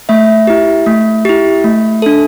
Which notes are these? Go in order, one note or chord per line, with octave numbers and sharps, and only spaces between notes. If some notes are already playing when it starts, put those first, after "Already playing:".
A3 E5
E4 G4
A3
E4 G4
A3
D4 A4